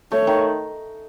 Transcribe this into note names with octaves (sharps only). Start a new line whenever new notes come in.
A3 C#5
D#3